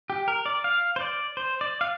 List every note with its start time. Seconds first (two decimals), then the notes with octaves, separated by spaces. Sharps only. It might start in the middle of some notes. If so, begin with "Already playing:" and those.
0.10 G4
0.28 A#4
0.46 D5
0.64 F5
0.96 C5
1.00 D5
1.37 C5
1.61 D5
1.81 F5